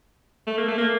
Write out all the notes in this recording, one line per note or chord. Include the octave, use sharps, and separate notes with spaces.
A3
A#3
A3
A#3